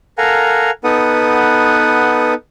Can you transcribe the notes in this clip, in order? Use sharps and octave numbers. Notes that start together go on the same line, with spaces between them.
A4 A#4 F5 F#5 G#5 A#5
B3 D#4 A4 B4 F#5 D#6